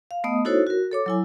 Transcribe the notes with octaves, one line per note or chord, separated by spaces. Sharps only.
F5
A3 B3 D#5 D#6
D#4 E4 F#4 A4 C5 C#5
F#4 A#4
A4 C#5 D6
F#3 E4 G#5